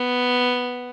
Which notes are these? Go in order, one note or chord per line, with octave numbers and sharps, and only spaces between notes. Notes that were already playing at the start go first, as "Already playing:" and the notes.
Already playing: B3